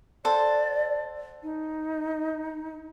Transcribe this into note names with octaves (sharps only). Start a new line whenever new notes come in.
A4 C5 D5 F#5
D#4